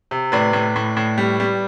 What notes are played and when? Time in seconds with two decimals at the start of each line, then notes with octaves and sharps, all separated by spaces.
0.11 C3
0.32 A2 B4 D5
0.53 A2
0.76 A2
0.97 A2
1.18 G3
1.40 G3